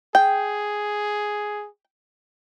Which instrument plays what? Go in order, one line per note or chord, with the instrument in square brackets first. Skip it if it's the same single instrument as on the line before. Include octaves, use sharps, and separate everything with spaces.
[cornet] G#4 [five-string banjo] G5